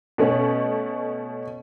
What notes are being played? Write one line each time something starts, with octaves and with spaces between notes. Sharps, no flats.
B2 A3 C#4